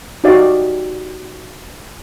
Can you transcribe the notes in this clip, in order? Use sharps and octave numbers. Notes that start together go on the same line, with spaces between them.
D#4 F#4 G4 D5 D#5 F5